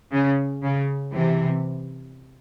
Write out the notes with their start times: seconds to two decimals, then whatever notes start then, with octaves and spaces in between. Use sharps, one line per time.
0.12 C#3
0.62 C#3
1.13 C3 E3